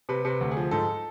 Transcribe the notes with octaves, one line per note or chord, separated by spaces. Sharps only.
C3 B4
C3
B4
D2
G#4
F3
G#2 A4